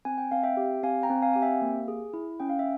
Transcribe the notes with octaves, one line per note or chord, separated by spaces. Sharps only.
C4 G#5
G5
C4 F5
E5 G5
G4
C4 F5 G#5
G5 A#5
C4
F5 G#5
G4 G#5
E5 G5
A#3
G#4
E4
C#4 G5
F5
E5